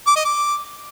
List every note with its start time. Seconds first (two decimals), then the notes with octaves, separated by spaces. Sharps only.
0.07 D6
0.16 D#5
0.25 D6